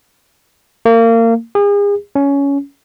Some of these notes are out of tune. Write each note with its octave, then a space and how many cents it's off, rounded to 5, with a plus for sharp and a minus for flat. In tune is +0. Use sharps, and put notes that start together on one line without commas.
A#3 -30
G#4 -40
C#4 +15